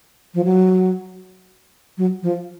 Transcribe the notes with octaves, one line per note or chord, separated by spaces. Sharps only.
F3
F#3
F#3
F3